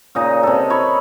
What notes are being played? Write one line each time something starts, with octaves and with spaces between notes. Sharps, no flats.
A#2 C#3 D#4 D#5
C3 A4
C#5 B5 C#6